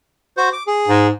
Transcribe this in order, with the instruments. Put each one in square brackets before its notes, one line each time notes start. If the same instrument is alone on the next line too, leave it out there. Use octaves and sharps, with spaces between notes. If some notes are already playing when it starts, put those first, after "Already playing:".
[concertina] F#4 C5
D6
G#4
[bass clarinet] G#2